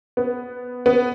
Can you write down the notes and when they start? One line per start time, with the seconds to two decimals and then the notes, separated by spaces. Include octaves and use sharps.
0.17 B3
0.86 B3